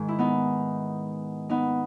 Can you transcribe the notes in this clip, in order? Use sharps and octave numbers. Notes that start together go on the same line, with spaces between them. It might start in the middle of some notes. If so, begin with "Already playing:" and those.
Already playing: G#2 D#3
E4
B3 D#4
B3 D#4